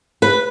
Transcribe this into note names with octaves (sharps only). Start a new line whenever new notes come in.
B4